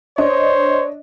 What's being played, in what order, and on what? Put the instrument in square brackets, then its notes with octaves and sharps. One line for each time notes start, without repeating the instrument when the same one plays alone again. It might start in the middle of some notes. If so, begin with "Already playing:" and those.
[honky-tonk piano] D4 D#5 [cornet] C5 [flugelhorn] C#5